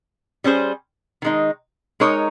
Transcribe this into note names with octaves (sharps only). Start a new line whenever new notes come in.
G3 C#4 G#4 C5
D#3 G#3 D#4
G#3 D#4 A#4 C#5